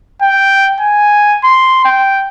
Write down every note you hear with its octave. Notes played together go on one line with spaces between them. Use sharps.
G5
G#5
C6
G5